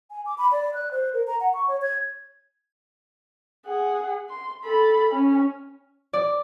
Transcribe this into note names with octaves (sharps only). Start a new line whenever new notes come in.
G#5
D6
B5
D5
F#6
C5
A#4
A#5
F#5
C#6
C#5
G#6
G#4 F#5
C6
A4 B5
C#4
D5